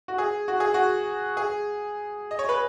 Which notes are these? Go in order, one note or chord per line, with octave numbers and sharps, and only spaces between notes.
F#4
G#4
F#4
G#4
F#4
G#4
D#5
C#5
B4